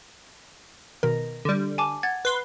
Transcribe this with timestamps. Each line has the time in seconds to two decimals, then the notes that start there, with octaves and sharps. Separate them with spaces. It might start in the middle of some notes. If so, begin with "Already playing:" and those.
1.03 B2 D#3 A#4
1.45 D3 G3
1.78 G#5 A5 D6
2.03 F#5 G#6 A6
2.25 B4 C6